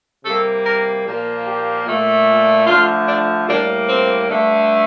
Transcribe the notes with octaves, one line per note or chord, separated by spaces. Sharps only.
C3 G3 A#3 A4
A#4
A#2 F3 A#3
G4
A#2 A3
D3 F3 A3 F4
D4
A2 G3 A#3 D4
C4
G2 D3 A3